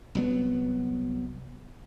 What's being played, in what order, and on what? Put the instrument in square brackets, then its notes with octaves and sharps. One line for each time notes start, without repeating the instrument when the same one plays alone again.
[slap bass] C2 F#3 B3